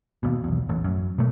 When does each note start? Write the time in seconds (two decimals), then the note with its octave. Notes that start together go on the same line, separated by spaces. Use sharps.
0.23 D#2 B2
0.44 B1 E2
0.69 A1
0.84 F#2
1.18 B2 A3